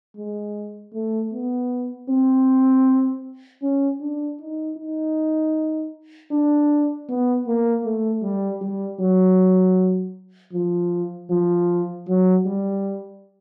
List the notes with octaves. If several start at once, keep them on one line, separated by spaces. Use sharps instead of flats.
G#3
A3
B3
C4
C#4
D4
D#4
D#4
D4
B3
A#3
A3
G3
G3
F#3
F3
F3
F#3
G3